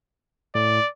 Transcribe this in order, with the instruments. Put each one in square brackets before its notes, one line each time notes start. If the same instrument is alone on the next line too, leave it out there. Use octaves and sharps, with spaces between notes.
[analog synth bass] A2 [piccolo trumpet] D5